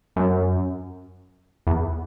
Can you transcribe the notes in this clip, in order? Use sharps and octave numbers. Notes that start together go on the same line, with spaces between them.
F#2
E2